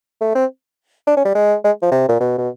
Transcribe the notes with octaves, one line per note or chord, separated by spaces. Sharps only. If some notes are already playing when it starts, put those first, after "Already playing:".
A3
C4
D4
C#4
G3
G#3
G#3
F3
C3
A#2
B2
B2